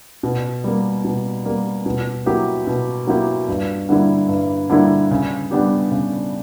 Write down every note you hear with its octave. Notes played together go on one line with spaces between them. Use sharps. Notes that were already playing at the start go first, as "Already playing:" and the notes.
B2
G3 A#3
B2
G3 A#3
B2
F#3 A#3 E4 G4
B2
F#3 A#3 E4 G4
G2
D3 G3 A#3 E4
G2
D3 G3 A#3 E4
C#3
G3 B3 D4 G4
C#3